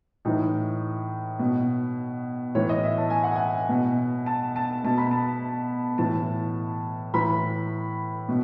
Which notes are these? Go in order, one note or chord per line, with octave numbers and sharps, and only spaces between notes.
A2 E3 D#4
B2
A2 E3 C#5
D#5
E5
A5
G#5
F#5
G#5
B2
A5
A5
B2 A5
B5
A5
A2 E3 A5
A2 E3 B5
B2